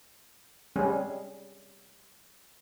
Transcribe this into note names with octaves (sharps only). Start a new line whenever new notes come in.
G3 G#3 C4 C#4 G#4